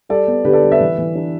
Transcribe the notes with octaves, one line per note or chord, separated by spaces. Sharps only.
G3 A4 D5
B3
D3 G4 B4
A4 D5
G3
B4 E5
E3
E3
D4